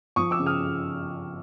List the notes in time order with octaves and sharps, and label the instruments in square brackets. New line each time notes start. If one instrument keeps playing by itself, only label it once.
[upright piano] F3 C#6 D#6
D6 E6
C#3
D#6 F6